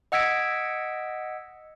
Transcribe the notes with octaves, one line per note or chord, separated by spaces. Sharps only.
D#5 F#5 E6 G#6 B6 D7